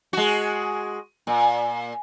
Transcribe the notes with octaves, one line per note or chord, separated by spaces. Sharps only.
G#3 F#4
A#2